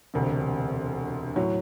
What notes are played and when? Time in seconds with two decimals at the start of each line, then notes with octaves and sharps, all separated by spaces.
0.14 E1 D2 C3
1.36 A2 F#3